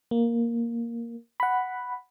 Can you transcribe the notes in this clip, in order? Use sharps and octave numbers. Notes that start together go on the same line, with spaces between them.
A#3
F#5 B5